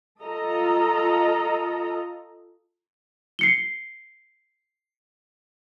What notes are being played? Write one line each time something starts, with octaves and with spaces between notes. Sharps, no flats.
F4 A4 D#5 A#5
C7 C#7 G7